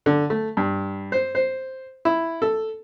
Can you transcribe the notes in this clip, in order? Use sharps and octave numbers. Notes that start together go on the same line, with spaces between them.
D3
A3
G2
C5
C5
E4
A4